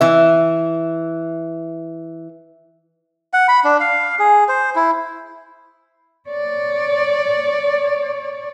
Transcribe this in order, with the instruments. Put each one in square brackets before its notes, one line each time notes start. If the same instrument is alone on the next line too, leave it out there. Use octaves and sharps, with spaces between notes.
[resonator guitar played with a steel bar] E3 E5
[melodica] F#5
B5
D4
F5
G#4
C5
E4
[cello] C#5 D5